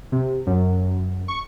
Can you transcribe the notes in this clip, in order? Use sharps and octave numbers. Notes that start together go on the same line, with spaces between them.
C3
F#2
C#6